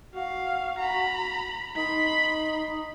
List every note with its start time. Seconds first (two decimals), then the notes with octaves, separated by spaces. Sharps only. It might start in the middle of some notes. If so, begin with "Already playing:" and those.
0.15 F#4 F5
0.79 A#5 B5
1.77 D#4 B5 C6